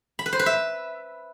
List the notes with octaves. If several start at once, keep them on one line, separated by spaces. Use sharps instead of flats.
B5
B4
C5
B4
E5